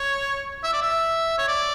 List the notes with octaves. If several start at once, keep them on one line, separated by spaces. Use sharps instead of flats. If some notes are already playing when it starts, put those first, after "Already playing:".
Already playing: C#5
E5
D5
E5
C#5
D5